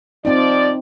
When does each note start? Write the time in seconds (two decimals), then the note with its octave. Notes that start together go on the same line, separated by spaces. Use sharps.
0.25 F3 C4 D#4 D5